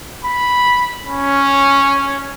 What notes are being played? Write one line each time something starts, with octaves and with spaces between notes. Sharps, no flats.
B5
C#4